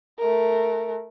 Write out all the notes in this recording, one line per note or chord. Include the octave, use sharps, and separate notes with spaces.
A3 A#4